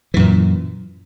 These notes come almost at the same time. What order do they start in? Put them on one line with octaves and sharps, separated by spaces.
E3 F#2 A#2